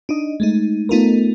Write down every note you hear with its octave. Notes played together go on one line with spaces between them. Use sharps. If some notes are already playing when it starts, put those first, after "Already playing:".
D4 D#4 D#5
G#3 A3 D#4
A3 B3 D#4 F4 A4 A#4